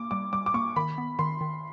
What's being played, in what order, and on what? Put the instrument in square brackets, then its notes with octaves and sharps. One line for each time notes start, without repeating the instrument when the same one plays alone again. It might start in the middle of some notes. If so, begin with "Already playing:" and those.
Already playing: [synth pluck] A#3 [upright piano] D6
[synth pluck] G3 [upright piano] D6
[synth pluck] G3 [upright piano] D6
[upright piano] D6
[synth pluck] A#3 [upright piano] C#6
[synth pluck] D#3 [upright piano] B5
[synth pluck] B3
[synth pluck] D#3 [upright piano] C6
[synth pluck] D#3